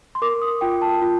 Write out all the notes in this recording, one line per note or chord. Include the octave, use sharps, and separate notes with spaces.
C6
A#4 D6
D#6
F4 G5
A5
F4